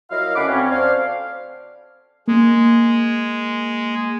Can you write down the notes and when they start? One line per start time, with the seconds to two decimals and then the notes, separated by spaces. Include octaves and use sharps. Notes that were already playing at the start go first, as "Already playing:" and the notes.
0.11 F#3 E4 A#4 D#5 F5
0.35 D3 A3 C#4 F#5 B5 D6
0.47 D2 C4 C#4
0.70 D4 C5 F5
2.28 G#3 A#3